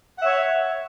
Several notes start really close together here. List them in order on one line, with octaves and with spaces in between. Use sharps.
F#5 E5 C#5